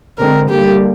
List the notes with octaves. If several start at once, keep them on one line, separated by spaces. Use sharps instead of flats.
D3 G#3 C4 A#4
D3 G3 A#3 G4